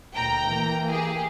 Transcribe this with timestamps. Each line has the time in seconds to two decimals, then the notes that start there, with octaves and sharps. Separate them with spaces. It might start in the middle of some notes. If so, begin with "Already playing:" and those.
0.15 D2 A#2 G5 A#5
0.47 E3 A#3
0.89 G4 G#4